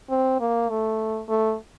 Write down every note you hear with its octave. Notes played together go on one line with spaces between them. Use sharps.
C4
A#3
A3
A3